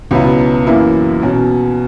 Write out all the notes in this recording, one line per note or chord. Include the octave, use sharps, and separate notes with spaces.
C#2 B2 F#3 B3 E4
F#2 E3 A#3 E4
B2 F#3 C#4